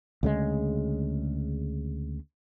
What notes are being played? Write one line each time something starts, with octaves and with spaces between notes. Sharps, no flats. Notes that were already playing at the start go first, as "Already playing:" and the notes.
D2 C#3 G#3